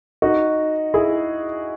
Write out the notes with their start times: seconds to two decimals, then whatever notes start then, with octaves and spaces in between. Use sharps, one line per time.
0.22 D#4 F#4
0.94 E4 G#4